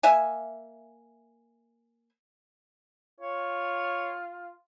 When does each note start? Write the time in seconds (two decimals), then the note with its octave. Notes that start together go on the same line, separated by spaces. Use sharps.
0.03 A#3 E5 G#5
3.21 F4 C#5